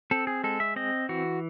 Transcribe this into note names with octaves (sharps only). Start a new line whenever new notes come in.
C4 A4
G#4
G#3 A4
E5
C4 D#5
E3 F#4